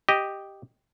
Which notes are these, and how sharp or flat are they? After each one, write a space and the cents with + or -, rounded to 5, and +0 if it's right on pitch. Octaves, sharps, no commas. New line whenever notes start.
G4 +0 D#5 +0